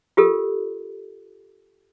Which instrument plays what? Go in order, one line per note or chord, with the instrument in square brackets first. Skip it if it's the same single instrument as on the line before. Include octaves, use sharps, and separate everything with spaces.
[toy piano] F4 G4 A4 A#4